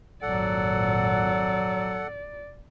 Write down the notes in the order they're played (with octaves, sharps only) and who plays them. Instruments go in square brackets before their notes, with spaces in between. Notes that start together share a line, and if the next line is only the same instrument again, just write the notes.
[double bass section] G#1 F2 A#2 [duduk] F#3 [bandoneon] A4 F#5 [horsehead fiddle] D5